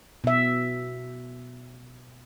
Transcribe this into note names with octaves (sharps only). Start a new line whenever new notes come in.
B2 E5